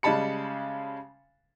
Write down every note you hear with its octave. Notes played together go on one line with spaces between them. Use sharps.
C#3 G3 G#3 A5 B5 C#7